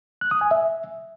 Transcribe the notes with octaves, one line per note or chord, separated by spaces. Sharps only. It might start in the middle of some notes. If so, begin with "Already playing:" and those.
F#6
D#6
G#5
E5